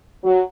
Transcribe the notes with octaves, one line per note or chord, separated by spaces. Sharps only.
F#3